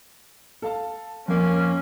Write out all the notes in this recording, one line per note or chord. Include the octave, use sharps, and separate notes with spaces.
A4 F5 A5
F2 A#3 C#4